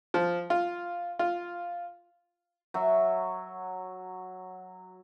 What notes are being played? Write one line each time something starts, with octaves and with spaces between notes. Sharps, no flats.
F3
F4
F4
F#3 E5